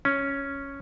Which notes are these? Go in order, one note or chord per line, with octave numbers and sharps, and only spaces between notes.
C#4